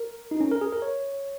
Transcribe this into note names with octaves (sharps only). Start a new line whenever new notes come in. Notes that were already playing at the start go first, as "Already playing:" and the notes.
Already playing: A#4
D#4
C#4
A#4
G#4
A#4
C#5